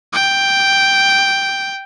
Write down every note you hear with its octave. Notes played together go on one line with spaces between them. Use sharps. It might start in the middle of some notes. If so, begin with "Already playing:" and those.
G5